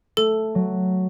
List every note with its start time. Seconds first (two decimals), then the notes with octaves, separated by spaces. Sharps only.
0.17 A3 A4
0.55 F#3